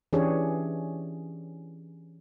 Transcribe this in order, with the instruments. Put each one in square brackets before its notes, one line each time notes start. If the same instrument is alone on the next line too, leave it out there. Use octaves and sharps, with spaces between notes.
[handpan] E3 C#4 D4 G4 G#4 C#5